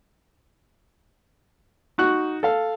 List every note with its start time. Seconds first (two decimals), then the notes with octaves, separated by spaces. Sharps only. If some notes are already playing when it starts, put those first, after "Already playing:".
1.98 D#4 F#4 F#6
2.43 A4 F5